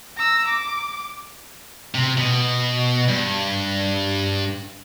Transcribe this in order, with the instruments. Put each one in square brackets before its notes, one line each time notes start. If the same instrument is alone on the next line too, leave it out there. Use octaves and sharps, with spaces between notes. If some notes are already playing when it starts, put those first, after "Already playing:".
[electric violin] A#5 E6
D6
[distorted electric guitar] C3
B2
G2